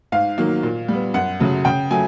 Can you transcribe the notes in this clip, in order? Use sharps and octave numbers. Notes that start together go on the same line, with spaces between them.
G#2 F5
D#3 F#3 A#3
A#2
G3 B3
F#2 F#5
C#3 F#3 A3
C#3 G5
F#3 A3 G#5